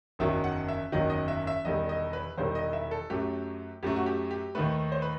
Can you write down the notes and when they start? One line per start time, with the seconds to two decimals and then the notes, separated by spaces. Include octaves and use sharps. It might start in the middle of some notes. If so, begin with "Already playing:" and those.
0.19 F#1 E2 D#3 F#3 E5
0.44 F#5
0.68 E5
0.92 F#1 E2 D#3 F#3 D#5
1.10 D#5
1.28 E5
1.47 E5
1.65 E1 E2 D#3 G3 D#5
1.89 D#5
2.13 B4
2.38 E1 E2 D#3 G3 C5
2.55 D#5
2.73 E5
2.91 A4
3.10 F#2 F#3 A3 G4
3.83 F#2 F#3 A3 G4
3.96 F#4
4.06 G4
4.31 G4
4.55 D#2 D#3 A3 B4
4.92 C5
5.02 B4